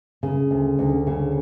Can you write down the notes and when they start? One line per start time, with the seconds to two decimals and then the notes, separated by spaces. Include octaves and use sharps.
0.23 C#3
0.51 D2
0.79 D2
1.07 C#3